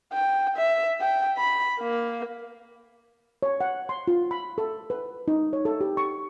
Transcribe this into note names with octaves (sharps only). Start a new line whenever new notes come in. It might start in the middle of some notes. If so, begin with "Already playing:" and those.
G5
E5
G5
B5
A#3
C#5
F#5
C6
F4
B5
A4
B4
D#4
C#5
A4
G4
C#6